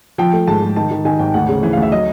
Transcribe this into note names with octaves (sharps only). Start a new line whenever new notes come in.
F3 G5
A3
G#2 A5
G#2
D#3 A5
D#3
D#3 G#5
G#1 G5
D2 F#5
C#3
E3
F5
D2
E5
F#3 D#5